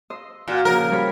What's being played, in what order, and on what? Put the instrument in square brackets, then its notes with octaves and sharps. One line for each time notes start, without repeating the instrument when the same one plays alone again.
[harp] D#5 C6 E6
[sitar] A#2 [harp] F4 F#4
[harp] A#2 C#3 F3 [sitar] A#4
[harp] G3 C#5 B5